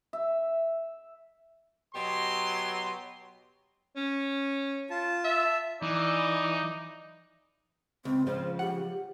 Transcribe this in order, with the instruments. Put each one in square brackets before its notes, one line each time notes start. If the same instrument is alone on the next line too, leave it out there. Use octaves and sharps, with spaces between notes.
[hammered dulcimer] E5
[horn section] B2 F#3 G4 C6
[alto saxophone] C#4
[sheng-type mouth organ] F4 A5
[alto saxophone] E5
[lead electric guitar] E3 [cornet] D#4 [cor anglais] D5
[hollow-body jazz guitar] C#2 [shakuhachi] C4
[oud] C#3 F3 G#3 [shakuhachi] C5
[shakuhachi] G4 [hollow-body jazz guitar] F#5